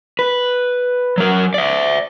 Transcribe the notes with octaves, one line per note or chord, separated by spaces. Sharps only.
B4
F#3 A#4
D5 E5